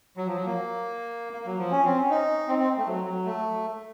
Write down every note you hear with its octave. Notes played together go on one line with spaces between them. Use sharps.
F#3
F3
F#3
A#3
A#3
F#3
F3
C#4
C4
C#4
D#4
C4
C4
A3
F#3
F#3
A3